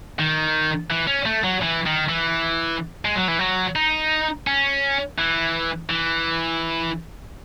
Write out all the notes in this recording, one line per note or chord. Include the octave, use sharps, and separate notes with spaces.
D#3
E3
C#4
A3
F#3
E3
D#3
E3
G#3
F#3
E3
F#3
D#4
C#4
E3
E3